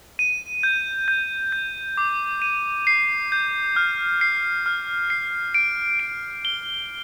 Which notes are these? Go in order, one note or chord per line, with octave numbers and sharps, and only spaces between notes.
D#7
G6
G6
G6
D6
D#7
C7
G6
F6
C7
F6
C7
D7
D7
G7